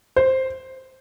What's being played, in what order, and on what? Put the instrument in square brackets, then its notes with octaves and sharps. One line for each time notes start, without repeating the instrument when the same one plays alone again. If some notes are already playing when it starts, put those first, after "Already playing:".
[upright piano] C5